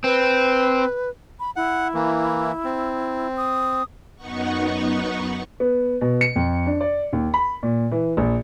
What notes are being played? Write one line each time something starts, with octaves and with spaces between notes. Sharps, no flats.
C4 B4
B5
E4 F#5
E3 A#3
C4
D#6
F#2 B3 D#4 F#5 C#6
B3
B2
C#7
F2
D4
D5
D#2
B5
A#2
E3
A#1